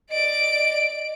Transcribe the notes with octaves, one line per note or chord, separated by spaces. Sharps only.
D5 D#5 D7